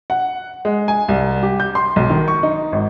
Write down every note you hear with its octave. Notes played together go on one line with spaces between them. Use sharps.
F#5
G#3
G#5
C2
G4
G6
C6
B1
D#3
C#6
D#4
G#1